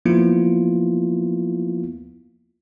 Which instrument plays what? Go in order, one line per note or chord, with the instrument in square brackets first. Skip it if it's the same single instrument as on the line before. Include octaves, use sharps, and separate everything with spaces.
[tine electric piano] F3 A#3 B3 E4 F4